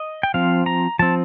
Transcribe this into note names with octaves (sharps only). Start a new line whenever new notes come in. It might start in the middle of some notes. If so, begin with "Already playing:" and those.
Already playing: D#5
G5
F3 C4 F5
A#5
F3 C4 A5